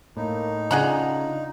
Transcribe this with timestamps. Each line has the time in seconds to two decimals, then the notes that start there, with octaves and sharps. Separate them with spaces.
0.17 A2 A#3 D#4
0.71 C#3 D4 F4 G#4 F#5 A#5